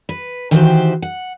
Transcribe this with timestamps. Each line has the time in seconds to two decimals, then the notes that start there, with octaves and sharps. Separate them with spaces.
0.09 B4
0.51 D#3 E3 E4 F#4 G4 C5
1.02 F#5